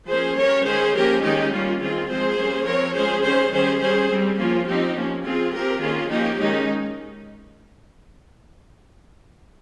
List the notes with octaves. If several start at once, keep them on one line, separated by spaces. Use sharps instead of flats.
F3 A#3 C#4 G#4 C5
G3 C#4 A#4 C#5
D#3 G#3 C#4 G#4 C5
F3 A#3 C#4 G4 A#4
D#3 G#3 C#4 D#4 G4
G3 A#3 C#4 F4
D#3 G3 C4 F4 G#4
F3 G#3 C4 G#4 C5
G3 A#3 C#4
F3 C4 A#4 C#5
F3 G#3 C#4 G#4 C5
D#3 G3 C#4 G#4 C5
D#3 G3 C#4 G#4 C5
G3 C#4 G#4 C5
G3 C4
F3 A#3 C#4 F4
F3 C4 D#4 G4
F3 A#3 C#4
F3 C4 F4 G#4
F3 C4 G4 A#4
D#3 A#3 C#4 F4 G#4
F3 A#3 C#4 D#4 G4
D#3 G#3 C#4 D#4